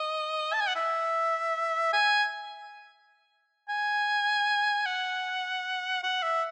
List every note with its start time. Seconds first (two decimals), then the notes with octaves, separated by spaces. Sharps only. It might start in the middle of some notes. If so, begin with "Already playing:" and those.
Already playing: D#5
0.53 A5
0.61 G#5
0.68 F#5
0.75 E5
1.93 G#5
3.69 G#5
4.86 F#5
6.03 F#5
6.23 E5